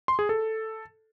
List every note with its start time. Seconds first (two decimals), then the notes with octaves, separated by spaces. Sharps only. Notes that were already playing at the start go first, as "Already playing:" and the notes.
0.08 C6
0.19 G#4
0.29 A4